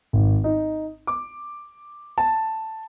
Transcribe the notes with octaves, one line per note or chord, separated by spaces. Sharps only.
G#1
D#4
D6
A5